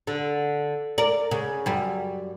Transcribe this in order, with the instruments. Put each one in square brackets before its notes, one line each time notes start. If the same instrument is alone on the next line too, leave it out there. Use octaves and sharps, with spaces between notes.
[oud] D3
A#4 D5
C#3
F#2 G3